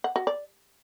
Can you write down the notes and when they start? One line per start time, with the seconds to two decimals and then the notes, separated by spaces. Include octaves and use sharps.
0.04 F#5
0.16 F#4
0.27 D5